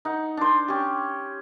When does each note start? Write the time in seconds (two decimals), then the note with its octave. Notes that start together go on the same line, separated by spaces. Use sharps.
0.05 D#4 F#5
0.37 D4 C5
0.68 C#4 G4